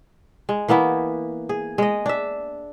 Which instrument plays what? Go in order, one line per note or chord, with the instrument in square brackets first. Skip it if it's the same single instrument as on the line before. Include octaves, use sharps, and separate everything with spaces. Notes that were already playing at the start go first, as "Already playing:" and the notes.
[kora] G#3
E3 A#3 B3 E4
G#4
G#3 D#5
D4 E5